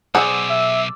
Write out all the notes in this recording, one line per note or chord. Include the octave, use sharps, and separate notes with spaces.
B1 G#4 C5 D5 F#5 E6
E5